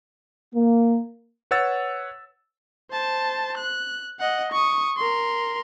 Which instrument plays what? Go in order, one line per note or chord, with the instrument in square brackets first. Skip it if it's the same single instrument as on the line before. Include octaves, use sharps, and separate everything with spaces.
[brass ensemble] A#3
[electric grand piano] B4 C#5 F#5 E6 A6
[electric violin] C5 A5
F#6
D#5 F#5
C#6 D#6
A#4 C6